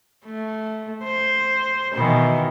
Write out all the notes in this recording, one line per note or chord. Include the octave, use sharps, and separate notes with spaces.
A3
C5
B2 D#3 E3